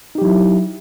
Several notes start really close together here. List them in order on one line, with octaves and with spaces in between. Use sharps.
D#4 G4 F#3 E4